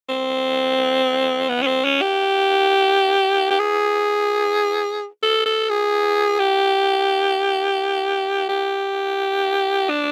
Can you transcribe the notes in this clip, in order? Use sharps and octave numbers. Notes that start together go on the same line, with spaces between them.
C4
B3
C#4
C4
C#4
G4
G4
G#4
A4
A4
G#4
G4
G4
D4